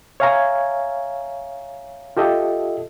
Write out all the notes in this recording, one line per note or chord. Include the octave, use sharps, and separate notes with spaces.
C#5 E5 F5 G#5 A#5
F4 G4 A4 D#5 E5